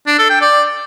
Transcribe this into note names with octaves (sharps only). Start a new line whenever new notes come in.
D4
A4
G5
D5